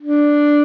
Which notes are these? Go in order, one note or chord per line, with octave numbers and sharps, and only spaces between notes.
D4